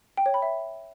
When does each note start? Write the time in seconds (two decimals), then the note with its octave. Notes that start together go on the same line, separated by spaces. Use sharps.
0.17 G5
0.26 C#5
0.34 B5
0.42 E5